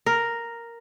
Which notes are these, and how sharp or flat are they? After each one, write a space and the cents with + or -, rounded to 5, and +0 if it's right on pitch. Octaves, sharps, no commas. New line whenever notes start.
A#4 +0